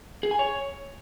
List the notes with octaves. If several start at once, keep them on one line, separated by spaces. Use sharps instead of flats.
G#4
G#5
C#5